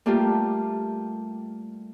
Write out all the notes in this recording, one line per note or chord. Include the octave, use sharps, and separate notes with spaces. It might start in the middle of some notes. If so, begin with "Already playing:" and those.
G3 A3 A#3 F4 G4